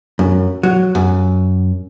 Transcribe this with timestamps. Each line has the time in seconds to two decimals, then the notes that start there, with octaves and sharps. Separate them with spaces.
0.19 F#2
0.63 F#3
0.95 F#2